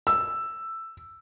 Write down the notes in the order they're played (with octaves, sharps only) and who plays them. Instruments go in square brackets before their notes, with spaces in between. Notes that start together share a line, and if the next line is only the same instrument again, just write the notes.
[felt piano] E6